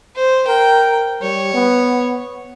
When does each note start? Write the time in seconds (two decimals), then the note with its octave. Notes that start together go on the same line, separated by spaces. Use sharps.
0.16 C5
0.47 A#4 G5
1.22 G3 C#5
1.54 B3